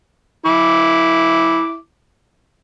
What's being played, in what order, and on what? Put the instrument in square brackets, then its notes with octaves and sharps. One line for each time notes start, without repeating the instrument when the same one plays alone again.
[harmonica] E4 D6